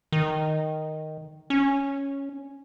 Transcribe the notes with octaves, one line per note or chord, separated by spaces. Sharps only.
D#3
C#4